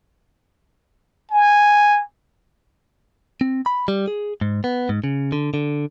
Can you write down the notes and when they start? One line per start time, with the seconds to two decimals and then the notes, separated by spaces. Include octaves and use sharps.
1.31 G#5
3.41 C4
3.66 B5
3.88 G3
4.08 G#4
4.41 G#2
4.64 B3
4.89 G#2
5.04 C#3
5.32 D3
5.54 D3